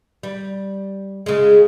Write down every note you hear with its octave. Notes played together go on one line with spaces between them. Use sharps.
G3
C#3 G#3